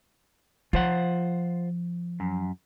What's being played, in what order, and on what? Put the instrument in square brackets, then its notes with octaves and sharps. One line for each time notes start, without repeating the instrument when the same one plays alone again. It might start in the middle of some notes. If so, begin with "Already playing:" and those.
[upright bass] F3 [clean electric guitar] F4 C5 F#5
[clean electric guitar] F#2